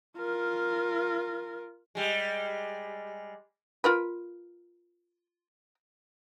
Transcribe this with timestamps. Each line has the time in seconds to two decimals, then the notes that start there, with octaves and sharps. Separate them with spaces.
0.18 F4 A#4
1.95 G3 G#3
3.84 F4 A#4 B4